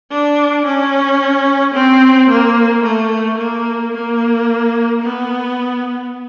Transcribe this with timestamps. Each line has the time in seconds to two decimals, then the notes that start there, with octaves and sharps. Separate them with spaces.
0.11 D4
0.65 C#4
1.74 C4
2.29 A#3
2.83 A3
3.38 A#3
3.93 A#3
5.02 B3